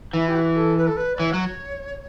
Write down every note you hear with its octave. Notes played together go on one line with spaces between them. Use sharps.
E3 E4
G4
F#4
A4
B4
A4
B4
D5
E3 C#5
F#3